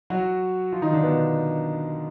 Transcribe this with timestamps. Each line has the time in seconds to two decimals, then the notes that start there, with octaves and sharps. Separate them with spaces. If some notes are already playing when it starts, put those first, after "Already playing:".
0.10 F#3 F#4
0.72 F3 F4
0.82 D#3 D#4
0.93 D3 D4
1.03 B2 B3